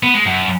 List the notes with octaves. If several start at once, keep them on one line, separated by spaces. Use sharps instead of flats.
B3
G#3
F#2